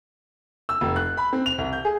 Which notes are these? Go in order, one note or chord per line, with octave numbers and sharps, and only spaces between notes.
E6
F1
F#6
B5
C4
F7
C2
G6
G#4